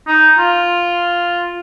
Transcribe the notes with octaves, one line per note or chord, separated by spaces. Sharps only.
D#4
F4